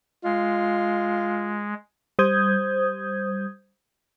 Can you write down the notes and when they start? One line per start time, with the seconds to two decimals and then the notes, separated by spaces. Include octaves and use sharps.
0.24 G#3 F4
2.19 G3 C5 D#6 G6 G#6